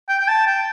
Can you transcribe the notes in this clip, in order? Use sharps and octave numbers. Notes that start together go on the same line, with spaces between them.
G5
G5
A5
G5